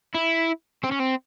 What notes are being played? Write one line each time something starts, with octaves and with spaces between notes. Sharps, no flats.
E4
C4
C#4
C4